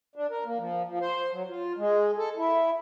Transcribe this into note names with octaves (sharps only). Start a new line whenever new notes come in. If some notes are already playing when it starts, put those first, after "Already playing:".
D4
A#4
A#3
F3
F3
C5
F#3
F4
G#3
A4
E4